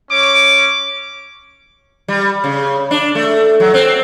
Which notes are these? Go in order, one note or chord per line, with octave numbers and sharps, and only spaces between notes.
C#4 C#5 D6
G3
C#3
D4
A3
F#3
C4